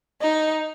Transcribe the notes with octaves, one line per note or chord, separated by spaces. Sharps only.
D#4